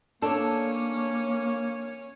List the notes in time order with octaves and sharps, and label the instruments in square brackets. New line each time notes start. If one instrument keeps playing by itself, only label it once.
[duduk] A#3 [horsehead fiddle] C#4 C#5 [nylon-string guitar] D4 A4